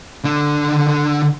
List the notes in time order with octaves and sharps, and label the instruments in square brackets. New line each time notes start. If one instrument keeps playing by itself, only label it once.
[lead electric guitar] D3 D4